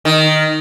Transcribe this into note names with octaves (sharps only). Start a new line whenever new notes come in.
D#3